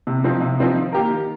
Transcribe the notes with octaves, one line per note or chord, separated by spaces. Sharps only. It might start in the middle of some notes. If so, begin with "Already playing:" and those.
C3
F3 C4 D#4
C3
F3 C4 D#4
D#3
A#3 G4 A#4
D#3